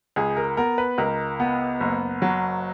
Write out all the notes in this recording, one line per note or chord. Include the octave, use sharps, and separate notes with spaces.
C#2 G#4
A#4
B3 A#4
B4
C#2 A#4
B3
F#1
F#3